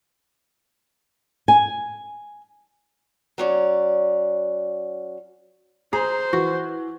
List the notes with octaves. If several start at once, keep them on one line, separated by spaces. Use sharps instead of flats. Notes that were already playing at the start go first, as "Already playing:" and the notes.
G#5
F#3 C#4 D5
G#4 C5 A#5
E3 F#4